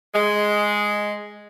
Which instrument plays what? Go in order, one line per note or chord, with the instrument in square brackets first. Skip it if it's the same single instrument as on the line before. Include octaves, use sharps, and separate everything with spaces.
[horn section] G#3